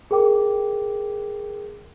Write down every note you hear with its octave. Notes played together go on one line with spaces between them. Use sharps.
G#4 A#4 G5 D6